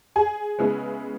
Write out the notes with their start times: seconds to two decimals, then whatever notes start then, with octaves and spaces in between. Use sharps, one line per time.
0.16 G#4 G#5
0.59 C#3 G#3 B3 E4